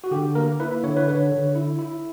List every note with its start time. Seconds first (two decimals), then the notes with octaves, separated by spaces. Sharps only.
0.04 F#4
0.11 D3 G4
0.35 A#3 A#4
0.60 E4 B4
0.84 D3 C#5
0.97 B4
1.08 D3 C#5
1.31 D3
1.55 E4
1.79 E4